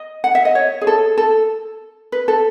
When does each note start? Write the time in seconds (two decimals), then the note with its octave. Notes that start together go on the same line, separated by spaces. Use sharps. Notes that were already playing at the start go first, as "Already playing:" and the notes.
Already playing: D#5
0.24 F#5
0.35 E5
0.45 D#5
0.55 C#5
0.81 G#4
0.87 A4
1.18 A4
2.12 B4
2.28 A4